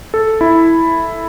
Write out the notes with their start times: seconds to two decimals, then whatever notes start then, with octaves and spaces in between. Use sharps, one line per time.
0.14 A4
0.41 E4